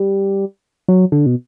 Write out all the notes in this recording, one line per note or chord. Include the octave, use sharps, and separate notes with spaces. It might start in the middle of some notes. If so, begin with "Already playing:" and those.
Already playing: G3
F#3
D3
B2